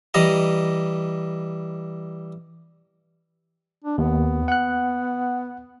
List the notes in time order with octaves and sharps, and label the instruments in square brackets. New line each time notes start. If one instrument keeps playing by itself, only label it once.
[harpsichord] E3 G3 D#5 A#5
[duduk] D4
[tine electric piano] D#2 [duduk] B3
[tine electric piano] F#5 F#6